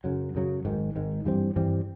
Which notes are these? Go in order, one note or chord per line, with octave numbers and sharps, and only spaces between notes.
F#2 C#3 F#3
F#2 C#3 F#3
G#1 G#2 D#3
G#1 G#2 D#3
G2 E3 G3 C4
G2 E3 G3 C4